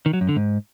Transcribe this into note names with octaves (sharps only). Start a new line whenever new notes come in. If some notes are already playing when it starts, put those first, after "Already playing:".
D#3
F#3
F#2
D3
G#2